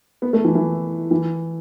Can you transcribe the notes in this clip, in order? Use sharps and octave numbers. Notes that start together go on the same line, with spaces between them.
B3
A3
E3
E3
E3